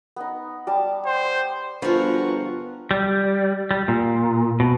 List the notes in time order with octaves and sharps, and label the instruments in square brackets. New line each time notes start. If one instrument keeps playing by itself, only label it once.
[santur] B3 D#4
G3 D5 A5
[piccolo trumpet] C5
[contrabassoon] G1 [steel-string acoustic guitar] F3 A#4 [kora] B3 F4 [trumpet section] F#4 F#5 C#6
[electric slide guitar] G3
G3
A#2
B2